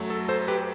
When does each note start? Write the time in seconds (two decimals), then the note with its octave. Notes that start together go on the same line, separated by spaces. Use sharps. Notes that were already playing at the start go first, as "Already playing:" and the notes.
Already playing: F#2 F#3 A3
0.10 A4
0.28 A4 C5
0.48 G4 B4